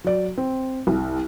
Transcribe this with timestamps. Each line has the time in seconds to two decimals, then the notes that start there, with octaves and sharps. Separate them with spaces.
0.04 F#3 D5
0.38 C4
0.87 C2